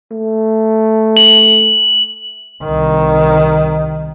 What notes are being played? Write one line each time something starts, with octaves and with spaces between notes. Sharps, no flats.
A3
F#7
C2 D#3